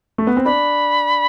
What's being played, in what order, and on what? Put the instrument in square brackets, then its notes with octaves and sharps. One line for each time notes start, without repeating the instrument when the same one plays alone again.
[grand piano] A3
B3
C4
[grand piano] D4 [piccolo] B5